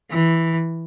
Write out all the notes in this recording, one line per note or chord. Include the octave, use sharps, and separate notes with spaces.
E3